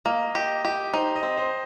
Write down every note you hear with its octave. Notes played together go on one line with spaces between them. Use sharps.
A#3 D#5
G4 D#5
G4 D#5
D#4 C5
D#5
C4
C5